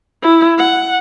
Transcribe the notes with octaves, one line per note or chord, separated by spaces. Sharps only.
E4
F#5